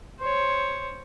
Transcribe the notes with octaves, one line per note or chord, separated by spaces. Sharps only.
C5 C#5